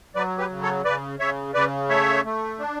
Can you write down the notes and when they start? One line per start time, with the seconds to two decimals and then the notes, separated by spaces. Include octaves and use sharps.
0.15 F#3 B4 D5
0.38 G4 B4
0.50 C#3
0.63 A4 C#5
0.85 C#3 B4 D5
1.20 C#3 C#5 E5
1.54 C#3 B4 D5
1.89 A3 C#5 E5
2.24 A3
2.59 D4